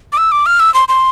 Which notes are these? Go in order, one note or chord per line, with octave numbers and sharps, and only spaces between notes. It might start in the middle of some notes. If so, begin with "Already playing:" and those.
D6
E6
D6
F6
E6
C6
C6